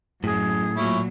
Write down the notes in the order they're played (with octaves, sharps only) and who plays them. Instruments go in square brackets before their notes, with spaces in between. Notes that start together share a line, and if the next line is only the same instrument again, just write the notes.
[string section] F#2 [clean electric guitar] A2 [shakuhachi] G#4
[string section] A#2 F#3 [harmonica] C#4 E4